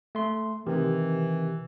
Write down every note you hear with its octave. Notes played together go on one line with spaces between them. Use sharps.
A3 C6
C3 D#3 E3 G4